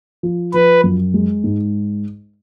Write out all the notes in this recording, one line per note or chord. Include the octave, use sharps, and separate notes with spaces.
F3
F3 B4
F#2
G#3
G#2